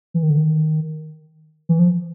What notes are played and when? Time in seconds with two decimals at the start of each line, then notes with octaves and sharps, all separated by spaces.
0.14 E3
0.23 D#3
0.30 D3
0.38 D#3
1.69 E3
1.79 F3